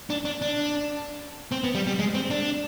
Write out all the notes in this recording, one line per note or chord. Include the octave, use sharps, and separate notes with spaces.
D4
D4
D4
C4
B3
G3
G3
G#3
C4
D4